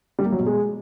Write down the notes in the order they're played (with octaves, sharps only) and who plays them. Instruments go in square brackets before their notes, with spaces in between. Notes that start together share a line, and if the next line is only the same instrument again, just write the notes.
[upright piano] G3
A#3
F#3
B2
G#3